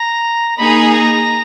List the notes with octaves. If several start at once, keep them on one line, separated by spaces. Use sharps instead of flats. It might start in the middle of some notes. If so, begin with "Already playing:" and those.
Already playing: A#5
A#3 D#4 G#4 B5
A#5